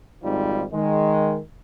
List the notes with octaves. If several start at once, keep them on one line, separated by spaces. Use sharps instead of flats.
G#1 F2 G#2 F3 G3 D#4
D#3 G#3